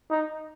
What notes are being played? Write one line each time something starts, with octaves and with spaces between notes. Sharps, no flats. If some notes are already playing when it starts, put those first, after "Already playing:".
D#4